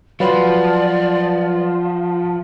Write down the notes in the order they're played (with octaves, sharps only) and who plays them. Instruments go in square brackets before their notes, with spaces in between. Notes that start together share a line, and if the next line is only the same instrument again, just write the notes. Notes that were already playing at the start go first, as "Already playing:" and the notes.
[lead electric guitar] F3 [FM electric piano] F#3 B4 [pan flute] D5 [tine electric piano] F5 F#5 C6